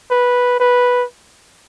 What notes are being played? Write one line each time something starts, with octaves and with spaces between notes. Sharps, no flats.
B4
B4